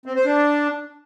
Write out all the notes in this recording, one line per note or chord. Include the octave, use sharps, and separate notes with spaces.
C4
C5
D4